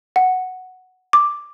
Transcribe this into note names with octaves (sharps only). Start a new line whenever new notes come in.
F#5
D6